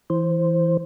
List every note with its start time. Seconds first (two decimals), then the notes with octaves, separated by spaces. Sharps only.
0.10 E3 C5